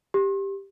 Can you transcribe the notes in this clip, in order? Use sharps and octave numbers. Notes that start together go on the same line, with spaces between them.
G4